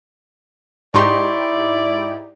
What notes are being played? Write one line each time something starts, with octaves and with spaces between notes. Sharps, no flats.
G#2 D#4 E4 G4 D5 C6 C#6